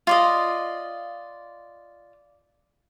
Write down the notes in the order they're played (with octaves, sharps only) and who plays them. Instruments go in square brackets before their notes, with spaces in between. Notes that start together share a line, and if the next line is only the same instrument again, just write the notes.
[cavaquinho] F4 D5 D#5